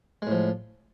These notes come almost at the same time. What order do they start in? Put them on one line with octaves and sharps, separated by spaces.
G#3 A2 F3